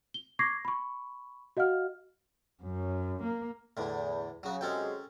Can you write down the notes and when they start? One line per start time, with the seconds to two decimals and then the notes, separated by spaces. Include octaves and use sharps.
0.14 G7
0.39 C#6 D6 G#6 A#6 C7
0.65 B5 C#6
1.57 F#4 D#5 F5 F#5 F6
2.63 F#2
3.23 A#3
3.77 E2 A2 D3
4.43 C#3 F#3 F#4
4.61 C3 F#3 G#3 C#4 A4 G5